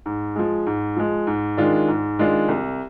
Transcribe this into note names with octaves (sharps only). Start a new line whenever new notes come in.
G#2
F3 G#3
G#2
F3 G#3
G#2
D#3 G#3 D4 F4
G#2
D#3 G#3 D4 F4
C2